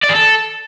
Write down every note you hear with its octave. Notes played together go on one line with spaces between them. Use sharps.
D5
G#4
A4